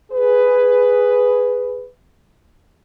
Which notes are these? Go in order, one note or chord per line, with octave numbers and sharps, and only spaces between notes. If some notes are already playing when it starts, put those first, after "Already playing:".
G#4 B4